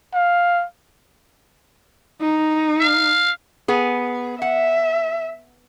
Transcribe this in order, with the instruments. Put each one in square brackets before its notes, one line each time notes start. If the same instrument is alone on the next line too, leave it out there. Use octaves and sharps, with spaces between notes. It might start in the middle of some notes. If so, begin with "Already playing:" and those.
[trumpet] F5
[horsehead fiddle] D#4
[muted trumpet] F5
[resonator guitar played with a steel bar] B3 G#4
[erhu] E5 [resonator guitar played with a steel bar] F#5